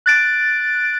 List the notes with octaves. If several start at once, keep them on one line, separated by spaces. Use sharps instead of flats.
F#6 A6 D7